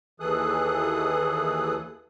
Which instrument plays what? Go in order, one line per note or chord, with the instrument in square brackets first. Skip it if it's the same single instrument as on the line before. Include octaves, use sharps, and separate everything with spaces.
[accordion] D#2 E3 G#4 A4 D#6 F#6